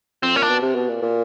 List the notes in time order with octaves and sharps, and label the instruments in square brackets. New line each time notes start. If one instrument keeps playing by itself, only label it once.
[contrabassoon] F2 [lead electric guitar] C4
[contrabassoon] A#2 [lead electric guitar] C#4
[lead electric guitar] D4
[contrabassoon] B2
C3
B2
A#2
A#2